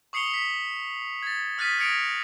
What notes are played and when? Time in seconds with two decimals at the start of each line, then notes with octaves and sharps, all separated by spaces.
0.13 C#6 D#6 C7 C#7 F7 G7
0.34 B6
1.23 G#6 A6
1.58 D#6 F6 F#6 A6 B6 D#7
1.78 D#6 G#6 A#6 C#7 D7 F7